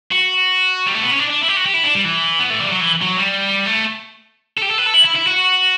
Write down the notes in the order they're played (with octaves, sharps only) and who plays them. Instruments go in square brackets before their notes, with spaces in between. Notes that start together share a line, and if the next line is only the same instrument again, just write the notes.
[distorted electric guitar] F#4
G3
A3
B3
C#4
D4
D4
E4
G4
F#4
G4
E4
D4
G3
E3
B3
A3
G3
F#3
E3
F#3
G3
A3
A4
G4
A4
B4
A4
E4
E4
E4
F#4